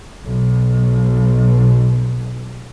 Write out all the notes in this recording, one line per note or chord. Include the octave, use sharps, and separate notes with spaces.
B1 B2